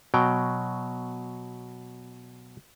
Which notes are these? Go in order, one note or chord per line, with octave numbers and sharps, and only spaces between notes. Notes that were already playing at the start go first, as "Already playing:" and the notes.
B2 F#3 G5